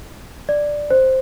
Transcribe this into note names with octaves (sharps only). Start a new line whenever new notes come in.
D5
C5